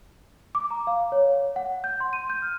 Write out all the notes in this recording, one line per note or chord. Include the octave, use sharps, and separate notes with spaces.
D6
A#5
F5
C#5
F#5
G6
C6
D#7
G6
F6